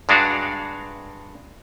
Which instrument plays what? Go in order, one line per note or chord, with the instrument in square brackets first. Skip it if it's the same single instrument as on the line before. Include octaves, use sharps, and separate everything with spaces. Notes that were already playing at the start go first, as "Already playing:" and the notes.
[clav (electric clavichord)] G2 G#3 D4 F#4 F5